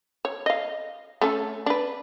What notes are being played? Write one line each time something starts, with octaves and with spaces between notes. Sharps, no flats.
C#5
D#5 F5
A3 C#4 A4
D4 B4